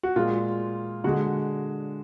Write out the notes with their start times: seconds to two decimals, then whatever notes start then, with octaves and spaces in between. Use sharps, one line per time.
0.03 F#4
0.16 A#2 G#3 F4
1.04 D3 F#4
1.07 G#3